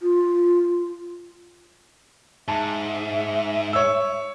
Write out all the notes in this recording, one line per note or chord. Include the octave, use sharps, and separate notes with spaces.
F4
G#2 E5 A5
C#5 E6